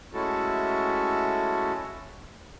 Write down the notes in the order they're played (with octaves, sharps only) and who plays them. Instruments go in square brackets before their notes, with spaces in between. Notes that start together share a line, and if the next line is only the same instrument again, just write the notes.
[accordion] G#3 A3 C#4 E4 F#4 A4